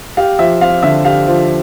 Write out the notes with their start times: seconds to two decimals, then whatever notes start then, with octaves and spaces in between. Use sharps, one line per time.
0.17 G4 F5
0.39 F3 E5
0.61 C4 F5
0.83 D3 E5
1.05 G4 F5
1.27 F3